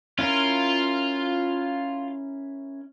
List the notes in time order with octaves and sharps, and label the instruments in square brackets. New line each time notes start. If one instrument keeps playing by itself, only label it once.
[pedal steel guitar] C#4 E4 A#4 [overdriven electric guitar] F4